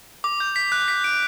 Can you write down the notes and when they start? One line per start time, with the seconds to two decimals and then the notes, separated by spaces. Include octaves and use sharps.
0.24 D6
0.40 G6
0.56 B6
0.72 F#6
0.88 B6
1.04 D7